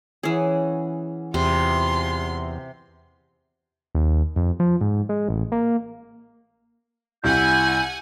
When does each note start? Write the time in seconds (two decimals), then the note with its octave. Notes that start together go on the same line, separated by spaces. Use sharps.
0.23 E3 C#4 G#4 C#5 F#5
1.34 E2 C3 F4 C6
3.95 D#2
4.36 F2
4.60 F3
4.81 G#2
5.09 G#3
5.29 A1
5.52 A#3
7.24 C2 E4 F#5 G#5 G6